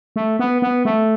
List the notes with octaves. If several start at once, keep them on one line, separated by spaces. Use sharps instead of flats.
A3
B3
B3
A3